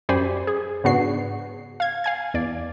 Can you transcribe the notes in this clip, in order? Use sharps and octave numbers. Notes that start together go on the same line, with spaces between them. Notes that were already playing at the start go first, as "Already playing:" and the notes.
F#2 G4 C5 D5 G#5 B5
G#4
G#2 C#3 B3 D4 F#4 C7
F5 G#6
F5 G#5 G#6
E2 D5